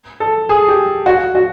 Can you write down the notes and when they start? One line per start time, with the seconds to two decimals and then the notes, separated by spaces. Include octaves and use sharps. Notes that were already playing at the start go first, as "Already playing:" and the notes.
0.20 A4
0.49 G#4
0.68 G4
1.06 F#4
1.35 F#4